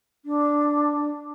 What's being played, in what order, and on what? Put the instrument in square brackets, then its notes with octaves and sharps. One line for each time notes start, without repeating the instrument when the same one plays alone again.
[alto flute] D4